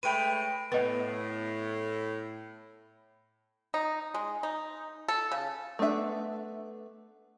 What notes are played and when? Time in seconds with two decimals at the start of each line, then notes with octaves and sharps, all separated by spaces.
0.03 G#3 A3 B4 C#5 G5 B5 D7 D#7
0.72 A2 B3 B4 D#5
3.74 D#4
4.14 G#3
4.43 D#4
5.08 A4
5.32 C#3
5.79 A3 B3 D4 G#4 E5